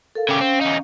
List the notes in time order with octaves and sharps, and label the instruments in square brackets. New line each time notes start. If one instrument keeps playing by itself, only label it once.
[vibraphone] A4 A#4 F5
[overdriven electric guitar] C#3 G4 [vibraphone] C#4 F5
[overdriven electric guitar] C4
E2 D#4